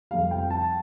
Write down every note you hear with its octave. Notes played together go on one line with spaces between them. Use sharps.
F2 C3 G3 F5
G5
A5